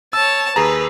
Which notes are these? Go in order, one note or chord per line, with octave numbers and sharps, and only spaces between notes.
C#5 A5 E6
D#2 G#4 B4 A#5